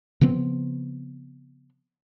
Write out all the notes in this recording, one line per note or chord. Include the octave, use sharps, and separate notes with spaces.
C#3 F3 B3 C4